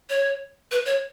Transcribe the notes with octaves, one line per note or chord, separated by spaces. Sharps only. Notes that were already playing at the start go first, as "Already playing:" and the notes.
C#5
B4
C#5